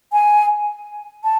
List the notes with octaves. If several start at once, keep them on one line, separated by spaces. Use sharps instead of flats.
G#5
A5